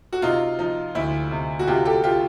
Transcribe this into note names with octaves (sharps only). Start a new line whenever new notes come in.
F#4
C3 D#4 F4
F3 D#4
D2 E4
C3
F#4
C3 F4 G4
G4 A4
F4 G4